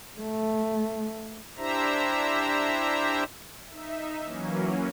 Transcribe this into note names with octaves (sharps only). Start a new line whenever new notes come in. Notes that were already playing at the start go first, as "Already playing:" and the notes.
A3
D4 E4 G4 C5 E5 A#5
D#4 E5
E3 F#3 A#3 C#4